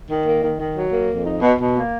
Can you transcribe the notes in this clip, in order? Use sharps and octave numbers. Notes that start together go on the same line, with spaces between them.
D#3
A#3
D#3
D#3
F#3
A#3
F2
D#4
B2
B2
A#3